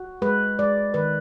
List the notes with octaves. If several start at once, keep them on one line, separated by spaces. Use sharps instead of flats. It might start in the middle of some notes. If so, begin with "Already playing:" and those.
Already playing: F#4
G#3 B4
G#3 D5
D#3 B4